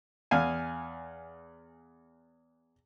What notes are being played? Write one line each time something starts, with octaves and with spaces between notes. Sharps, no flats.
E2 F5 G#5